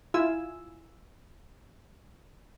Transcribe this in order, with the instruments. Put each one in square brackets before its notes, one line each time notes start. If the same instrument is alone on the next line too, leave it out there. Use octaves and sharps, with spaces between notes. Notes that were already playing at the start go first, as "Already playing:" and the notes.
[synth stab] E4 F4 G#5 E6